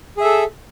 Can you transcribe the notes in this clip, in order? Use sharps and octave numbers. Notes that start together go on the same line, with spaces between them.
G#4 A4 E5